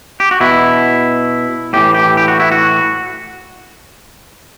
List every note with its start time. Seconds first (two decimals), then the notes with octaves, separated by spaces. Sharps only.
0.20 G4
0.31 F#4
0.41 B2 E4
1.73 A2 E3 G4
1.94 G4
2.17 G4
2.28 F#4
2.40 E4
2.52 F#4